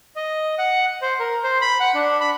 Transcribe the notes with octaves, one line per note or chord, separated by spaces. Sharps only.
D#5
F#5
C5
A#4
C5
B5
F#5
D4
B5